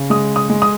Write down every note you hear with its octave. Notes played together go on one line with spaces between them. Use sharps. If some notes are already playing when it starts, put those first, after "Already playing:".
Already playing: C#3
G#3 D#6
D#6
G#3
D#6